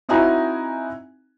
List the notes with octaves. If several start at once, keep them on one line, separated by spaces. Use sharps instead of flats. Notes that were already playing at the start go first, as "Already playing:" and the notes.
C4 D#4 E4 F#4 G#5 A#5